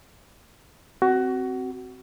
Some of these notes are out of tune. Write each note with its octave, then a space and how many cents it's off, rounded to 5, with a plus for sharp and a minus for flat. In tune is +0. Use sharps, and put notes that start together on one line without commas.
C4 -5 F#4 +20